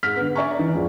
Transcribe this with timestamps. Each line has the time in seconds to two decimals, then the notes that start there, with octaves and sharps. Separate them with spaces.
0.03 G#2 F6 B6
0.17 D3 B3
0.35 D5 E5 G#5 A#5 C#6
0.58 E3 D#4
0.75 F2 G#2